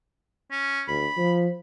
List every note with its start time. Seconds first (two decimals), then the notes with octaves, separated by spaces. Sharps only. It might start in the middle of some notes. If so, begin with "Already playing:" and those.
0.51 C#4
0.88 D2 B5
1.17 F3